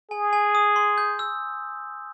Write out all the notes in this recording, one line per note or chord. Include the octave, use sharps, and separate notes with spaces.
G#4 G#5
G#5
D#6
C6
G6
E6